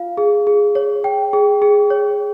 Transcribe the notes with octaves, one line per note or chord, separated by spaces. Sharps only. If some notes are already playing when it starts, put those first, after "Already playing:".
Already playing: F4 F5
G#4
G#4
C#5
G5
G#4
G#4
C#5